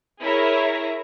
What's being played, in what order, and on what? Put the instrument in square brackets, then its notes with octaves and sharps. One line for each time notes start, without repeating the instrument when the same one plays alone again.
[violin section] E4 G#4 A#4 C#5 E5 A#5